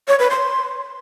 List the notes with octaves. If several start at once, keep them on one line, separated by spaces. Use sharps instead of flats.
C#5
B4
C6